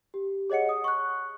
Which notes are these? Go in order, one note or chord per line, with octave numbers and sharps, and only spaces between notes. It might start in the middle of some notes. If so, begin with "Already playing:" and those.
G4
G#4 C#5 D#5 F#5 C#7
D#6
C#6 F#6